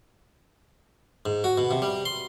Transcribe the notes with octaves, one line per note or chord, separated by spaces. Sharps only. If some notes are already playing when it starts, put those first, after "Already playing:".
G#2
F#4
B2
C3
G3
C6